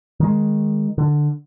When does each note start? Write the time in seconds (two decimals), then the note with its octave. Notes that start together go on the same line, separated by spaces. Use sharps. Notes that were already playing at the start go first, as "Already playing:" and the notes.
0.20 D#3 G#3
0.98 D3